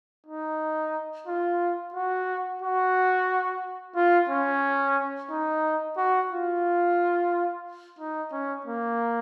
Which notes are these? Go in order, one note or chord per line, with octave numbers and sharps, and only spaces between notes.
D#4
F4
F#4
F#4
F4
C#4
D#4
F#4
F4
D#4
C#4
A#3